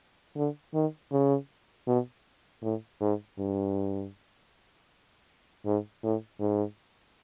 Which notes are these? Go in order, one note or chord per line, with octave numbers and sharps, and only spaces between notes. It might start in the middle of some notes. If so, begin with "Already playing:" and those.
D3
D#3
C#3
B2
A2
G#2
G2
G#2
A2
G#2